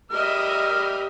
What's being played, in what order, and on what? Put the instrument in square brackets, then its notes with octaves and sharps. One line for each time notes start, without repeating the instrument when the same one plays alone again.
[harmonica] G3 F6 [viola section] A#4 D#5 E5